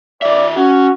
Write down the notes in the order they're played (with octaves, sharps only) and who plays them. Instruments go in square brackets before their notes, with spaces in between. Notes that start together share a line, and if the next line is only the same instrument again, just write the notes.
[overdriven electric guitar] D#3 E5 [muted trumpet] D5
[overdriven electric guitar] C#4 [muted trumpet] F#4